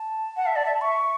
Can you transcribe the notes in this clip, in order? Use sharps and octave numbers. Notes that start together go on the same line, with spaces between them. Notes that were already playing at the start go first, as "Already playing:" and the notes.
Already playing: A5
F#5
E5
D5
E5
E5 C#6